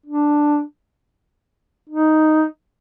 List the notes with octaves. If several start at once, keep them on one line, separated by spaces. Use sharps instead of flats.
D4
D#4